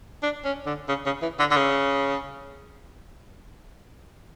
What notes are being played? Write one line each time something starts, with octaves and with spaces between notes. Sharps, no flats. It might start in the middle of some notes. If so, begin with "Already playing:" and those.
D4
C#4
D3
C#3
C#3
E3
D3
D3
C#3